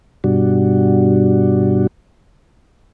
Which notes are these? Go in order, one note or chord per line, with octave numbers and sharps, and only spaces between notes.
G2 B2 G3 D4 F#4